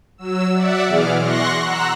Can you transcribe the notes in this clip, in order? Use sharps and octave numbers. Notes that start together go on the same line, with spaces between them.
F#3 E6
D5 E5 F#5
B2 E3 G#4 D6 F6
C6 C#6 F#6 A#6
F#5 A#5 E6 F#6